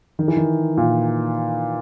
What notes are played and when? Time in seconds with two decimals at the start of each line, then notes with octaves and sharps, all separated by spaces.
0.19 D#3
0.28 E3
0.37 D#3
0.77 A#2